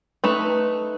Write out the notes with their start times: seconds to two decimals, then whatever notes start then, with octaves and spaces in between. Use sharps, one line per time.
0.24 A3 D#4 B4